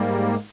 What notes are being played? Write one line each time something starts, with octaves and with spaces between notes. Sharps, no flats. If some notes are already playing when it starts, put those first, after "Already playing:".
Already playing: G#2 G3 A#3